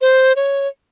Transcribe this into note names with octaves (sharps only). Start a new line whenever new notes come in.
C5
C#5